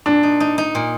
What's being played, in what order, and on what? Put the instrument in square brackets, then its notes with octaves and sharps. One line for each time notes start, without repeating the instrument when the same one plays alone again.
[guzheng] A#2 [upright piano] D4
[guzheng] D#4
D#4
D#4
A#2